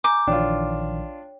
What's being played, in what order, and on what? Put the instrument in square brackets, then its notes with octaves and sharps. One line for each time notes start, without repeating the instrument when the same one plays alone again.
[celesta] G#5 A#5 G6 [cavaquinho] D6
[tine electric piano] A#1 D#3 E3 [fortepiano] D4 F4 [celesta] C#5 G5